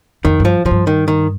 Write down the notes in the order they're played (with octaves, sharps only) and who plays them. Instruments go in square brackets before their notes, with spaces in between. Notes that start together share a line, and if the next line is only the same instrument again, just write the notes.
[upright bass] F2 [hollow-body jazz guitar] D#3
[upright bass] G2
[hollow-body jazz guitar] F3
[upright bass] A2 [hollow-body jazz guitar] F3
[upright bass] G2
[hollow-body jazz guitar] D#3
D#3